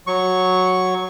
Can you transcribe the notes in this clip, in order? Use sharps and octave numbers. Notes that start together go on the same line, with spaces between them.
F#3 C#6